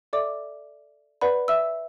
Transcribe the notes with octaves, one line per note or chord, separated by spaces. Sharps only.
A4 D5 E5 D6
B4 D5 F#5 B5
E5 E6